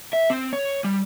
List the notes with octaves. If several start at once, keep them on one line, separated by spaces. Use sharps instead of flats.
E5
C4
C#5
G3